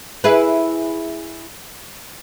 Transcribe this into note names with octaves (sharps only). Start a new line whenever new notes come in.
E4 G#4 B4